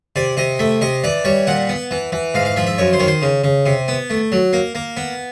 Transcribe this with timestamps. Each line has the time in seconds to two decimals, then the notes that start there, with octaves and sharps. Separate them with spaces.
0.16 C3 D5
0.37 C3 D#5
0.59 A3 E5
0.81 C3 D#5
1.04 E3 D5
1.25 G3 C#5
1.47 A#2 F#5
1.69 B3
1.91 E3
2.12 E3
2.34 G#2 F5
2.45 F5
2.57 F3 E5
2.67 E5
2.78 F#2 C#5
2.93 C5
3.00 D#3 C#5
3.07 C5
3.22 C#3
3.44 C#3
3.66 C3
3.88 B3
4.10 A3
4.32 F#3
4.53 A#3
4.75 A#3
4.97 B3